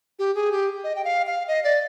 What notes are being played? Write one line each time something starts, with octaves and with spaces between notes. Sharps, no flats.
G4
G#4
G4
D#5
G5
F5
F5
D#5
D5